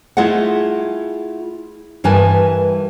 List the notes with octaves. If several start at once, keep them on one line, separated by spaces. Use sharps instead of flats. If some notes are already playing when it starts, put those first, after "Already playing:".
A3 E4 F4 G#4 D#5 F#5
G2 E3 A#4 B4 G#5 A5